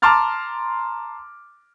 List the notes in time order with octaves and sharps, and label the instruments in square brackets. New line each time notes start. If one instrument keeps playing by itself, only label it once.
[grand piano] A5 A#5 C6 D6 F6 A6